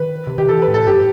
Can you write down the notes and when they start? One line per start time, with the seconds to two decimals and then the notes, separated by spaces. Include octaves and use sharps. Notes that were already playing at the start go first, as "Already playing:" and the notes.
Already playing: D#3 B4
0.27 C3
0.38 D#3 G4
0.49 E3 A4
0.62 B4
0.68 A2
0.74 A4
0.87 G2 G4